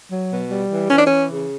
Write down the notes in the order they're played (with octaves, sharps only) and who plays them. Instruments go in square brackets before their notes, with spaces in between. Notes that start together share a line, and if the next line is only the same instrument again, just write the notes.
[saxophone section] F#3
B2
G3
E3
E3 C#4
D4
E3 C#4
C#3